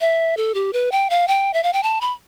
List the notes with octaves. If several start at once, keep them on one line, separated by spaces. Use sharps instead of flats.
E5
A4
G4
B4
G5
F5
G5
E5
F5
G5
A5
B5